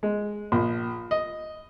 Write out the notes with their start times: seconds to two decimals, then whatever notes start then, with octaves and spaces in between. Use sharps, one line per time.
0.03 G#3
0.52 A#1
1.11 D#5